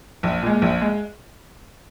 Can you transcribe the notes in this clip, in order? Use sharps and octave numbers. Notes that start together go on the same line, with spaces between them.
A#1
A#2 G#3
A#1
G#3